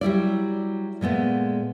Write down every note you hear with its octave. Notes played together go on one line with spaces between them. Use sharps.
F#3 G3 E4 D5
A#2 G#3 A3 B3